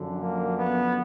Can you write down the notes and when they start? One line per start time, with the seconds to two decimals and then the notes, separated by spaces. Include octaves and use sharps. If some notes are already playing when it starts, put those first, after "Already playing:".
Already playing: F#2 D3 F3
0.19 A#3
0.58 B3